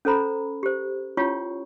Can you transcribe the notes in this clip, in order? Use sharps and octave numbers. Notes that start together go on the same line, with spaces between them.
C#4 A4 C5 A#5 B5
G4 C5
C#4 E4 F4 C#5 G5 C#6